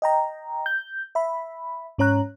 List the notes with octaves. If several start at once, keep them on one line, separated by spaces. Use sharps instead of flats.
D#5 G5 A#5
G6
E5 B5
G#2 C#4 C#5 A#5 F#6